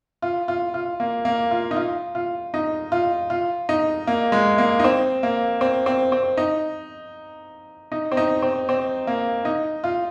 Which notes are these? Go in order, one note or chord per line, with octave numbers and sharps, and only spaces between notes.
F4
F4
F4
A#3
A#3
F4
D#4
F4
F4
D#4
F4
F4
D#4
A#3
G#3
A#3
D#4
C4
A#3
C4
C4
C4
D#4
D#4
C4
D#4
C4
C4
A#3
D#4
F4